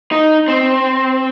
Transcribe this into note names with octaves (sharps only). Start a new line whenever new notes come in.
D#4
C4